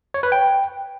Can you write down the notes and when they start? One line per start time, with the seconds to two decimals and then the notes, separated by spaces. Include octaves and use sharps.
0.14 C#5
0.23 B4
0.32 G5